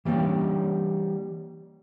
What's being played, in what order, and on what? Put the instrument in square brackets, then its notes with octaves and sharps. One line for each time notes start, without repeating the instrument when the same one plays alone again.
[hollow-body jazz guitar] E3 G3 A#3 C#4 D4